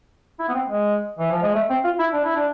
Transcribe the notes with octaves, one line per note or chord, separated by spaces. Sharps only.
E4
B3
C4
G#3
E3
F3
G#3
A3
C4
F4
E4
D4
E4
D4